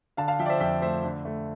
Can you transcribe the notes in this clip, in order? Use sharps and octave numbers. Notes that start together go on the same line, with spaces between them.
D3 F5 A5
F5 A5
F3 E5 G5
D5
C5 E5
F2 E5 G5
A3 C5 E5
D3
A3